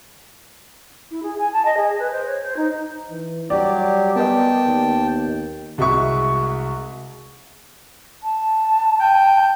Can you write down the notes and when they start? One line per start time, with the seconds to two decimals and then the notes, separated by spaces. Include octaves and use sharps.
1.11 E4
1.23 G#4
1.38 G#5
1.53 A5
1.65 D#5
1.77 G#4
1.99 B4
2.12 C5
2.26 C#5
2.44 C5
2.57 D#4
3.10 E3
3.50 F#3 G3 G4 D5
4.16 B3 A#4 D#5 G5 A5
4.67 D#2
5.78 C2 G#3 F#4 E5 C#6
8.23 A5
8.99 G5